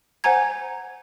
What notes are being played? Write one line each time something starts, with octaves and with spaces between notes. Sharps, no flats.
C5 F#5 G#5 A#5 G#6